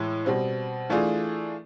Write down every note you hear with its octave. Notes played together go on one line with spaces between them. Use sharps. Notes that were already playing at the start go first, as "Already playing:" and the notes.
Already playing: A2 E3 G#3 E4
B2 G3 C4
E3 A3 D4 F4 G#4